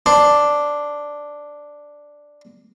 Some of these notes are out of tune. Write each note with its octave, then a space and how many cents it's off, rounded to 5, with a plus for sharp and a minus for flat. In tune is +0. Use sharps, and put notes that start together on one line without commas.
D4 +0 C5 -5